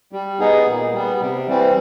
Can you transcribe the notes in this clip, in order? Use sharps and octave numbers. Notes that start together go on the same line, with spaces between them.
G3
B3 D#4 G#4
A#2
G3 B3
C3
E3 G3 C4